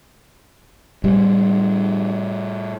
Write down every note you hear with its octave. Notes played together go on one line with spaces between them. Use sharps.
A2 G3